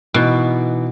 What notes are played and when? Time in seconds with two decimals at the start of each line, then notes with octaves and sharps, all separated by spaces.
0.14 B2 E3 D#4